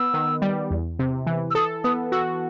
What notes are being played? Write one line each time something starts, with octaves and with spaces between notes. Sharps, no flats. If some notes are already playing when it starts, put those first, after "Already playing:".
Already playing: B3 E6
D#3
G3
E2
C3
E3
E6
A4 D#6
B3 D#6
F#4 E6